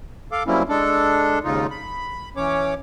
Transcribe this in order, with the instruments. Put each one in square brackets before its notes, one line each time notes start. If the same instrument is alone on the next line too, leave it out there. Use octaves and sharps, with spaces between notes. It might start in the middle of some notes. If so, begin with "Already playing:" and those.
[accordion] A4 F5 D6
F#3 G3 A#3 C4 C#4 E4
G#3 D4 A4
D#2 G#2 C#3 D#4 F4
B5
E3 C#4 C#5 D6